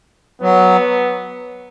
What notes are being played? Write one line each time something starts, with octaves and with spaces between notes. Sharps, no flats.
F#3 B3